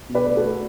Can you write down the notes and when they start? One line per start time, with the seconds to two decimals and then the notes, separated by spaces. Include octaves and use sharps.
0.09 B2
0.15 B4 D5
0.26 A3
0.37 F#4 A4
0.43 A3